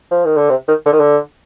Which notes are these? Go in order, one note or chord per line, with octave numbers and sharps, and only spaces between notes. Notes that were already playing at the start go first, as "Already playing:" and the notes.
F3
D#3
D3
C3
D#3
D3
D#3
D3